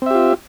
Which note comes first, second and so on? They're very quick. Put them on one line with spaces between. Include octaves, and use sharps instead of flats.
C4 E5 G4 F4